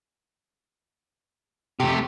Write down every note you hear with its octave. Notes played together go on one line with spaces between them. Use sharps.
C3 A3 G4